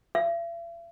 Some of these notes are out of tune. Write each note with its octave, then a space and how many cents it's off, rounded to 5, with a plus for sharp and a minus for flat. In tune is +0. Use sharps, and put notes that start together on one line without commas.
E5 +45